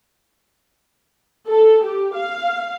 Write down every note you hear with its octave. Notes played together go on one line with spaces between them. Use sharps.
A4
G4
F5